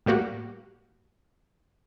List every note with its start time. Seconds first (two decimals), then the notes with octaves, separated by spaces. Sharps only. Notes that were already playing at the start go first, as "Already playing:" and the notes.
0.06 A2 G3 A#3 F#4 G4